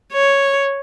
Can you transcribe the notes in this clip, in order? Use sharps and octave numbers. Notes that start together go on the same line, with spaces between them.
C#5